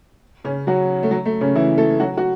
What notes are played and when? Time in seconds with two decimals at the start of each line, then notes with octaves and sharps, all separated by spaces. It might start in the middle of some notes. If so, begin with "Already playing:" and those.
0.44 C#3 C#4
0.67 F#3 F#4
1.03 A3
1.11 F#3
1.26 A3
1.41 C#3 C#4
1.55 E3 E4
1.78 A3 A4
2.00 F#3 F#4
2.17 F#4